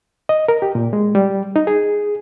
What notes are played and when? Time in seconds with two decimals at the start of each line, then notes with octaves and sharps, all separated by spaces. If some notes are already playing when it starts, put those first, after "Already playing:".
0.29 D#5
0.48 A#4
0.62 G4
0.75 A#2
0.93 G#3
1.15 G3
1.56 D#4
1.67 G#4